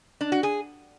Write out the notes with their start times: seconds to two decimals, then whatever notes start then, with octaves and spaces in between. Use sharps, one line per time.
0.21 D4
0.32 F#4
0.43 G#4